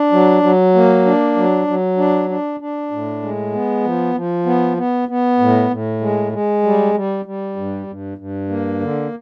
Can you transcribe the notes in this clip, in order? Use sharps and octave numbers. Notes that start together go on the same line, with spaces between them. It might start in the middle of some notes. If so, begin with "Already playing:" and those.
Already playing: D4
F#3
F#3
A#3
D4
F#3
F#3
D4
D4
D4
A2
G#3
B3
F3
F3
B3
B3
B3
A2
A2
G#3
G#3
G3
G3
G3
G2
G2
G2
A#3
D3